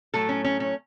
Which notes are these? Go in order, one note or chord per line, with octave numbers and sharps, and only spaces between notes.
A2 F#3 A3 A4
C#4
C#4
C#4